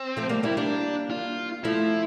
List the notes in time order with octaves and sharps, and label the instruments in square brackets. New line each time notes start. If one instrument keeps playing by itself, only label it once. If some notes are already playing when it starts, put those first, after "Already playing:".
Already playing: [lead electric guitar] C4
[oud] F3 A3
G3 A#3
[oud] G3 A#3 [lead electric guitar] E4
[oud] G3 A#3 [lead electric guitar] D4
[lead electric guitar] F4
[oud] F3 A3 [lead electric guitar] E4